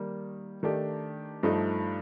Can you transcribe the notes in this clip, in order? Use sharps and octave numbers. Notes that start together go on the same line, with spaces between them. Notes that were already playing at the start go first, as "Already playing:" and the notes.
Already playing: D#3 G3 A#3
D#3 A3 D4 G4
G2 F3 A3 D#4